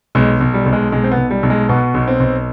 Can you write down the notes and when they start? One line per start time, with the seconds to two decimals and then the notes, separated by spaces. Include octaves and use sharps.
0.15 B1 G#3
0.41 B1
0.54 G3
0.66 B1
0.73 G#3
0.92 B1 G#3
1.04 C4
1.12 B3
1.18 B1
1.31 G3
1.43 B1
1.50 G#3
1.69 B2 B3
1.94 B1
2.08 C4
2.20 B1